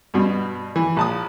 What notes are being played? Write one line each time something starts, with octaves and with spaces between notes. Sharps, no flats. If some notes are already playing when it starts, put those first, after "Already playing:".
G2 B2
E3
A#1 A5 D#6